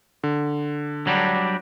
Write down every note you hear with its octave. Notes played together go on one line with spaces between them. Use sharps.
D3
F#3 G3 D4